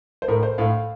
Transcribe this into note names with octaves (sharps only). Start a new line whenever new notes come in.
C5
A2 A#4
C5
A2 F5